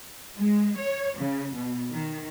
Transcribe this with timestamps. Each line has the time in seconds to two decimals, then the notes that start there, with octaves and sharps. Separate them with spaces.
0.37 G#3
0.78 C#5
1.18 C#3
1.54 B2
1.91 D#3